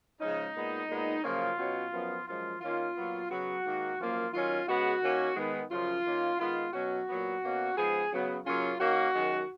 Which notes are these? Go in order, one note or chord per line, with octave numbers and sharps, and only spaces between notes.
C#3 F3 G#3 C#4 D#4
A#2 G#3 B3
A#2 G#3 B3
F#2 C#3 F3 A#3 C#4 F4
B2 F#3 C#4
F#2 F3 B3
F#2 F3 G#3 F4
D#3 A#3 C#4 F4
A#2 F#3 B3
C#3 F#3 B3 F#4
G#2 D#3 A#3
F#2 F3 A#3 F4
D#3 F#3 C#4 F4
C#3 G#3 B3 F#4
D#3 A#3 C#4
D#3 G#3 B3
F#2 C#3 F3 F4
D#3 A#3 C#4
D#3 G#3 B3 F4
B2 F#3 C#4 F#4
A#2 F#3 B3
B2 A#3 C#4
G#2 F3 B3 G#4
C#3 F#3 B3
C#3 F#3 A#3 C#4 F4
D#3 A#3 C#4 F#4
F#2 D#3 G#3